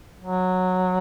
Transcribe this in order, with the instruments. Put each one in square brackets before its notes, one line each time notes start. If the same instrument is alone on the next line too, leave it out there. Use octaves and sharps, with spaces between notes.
[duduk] F#3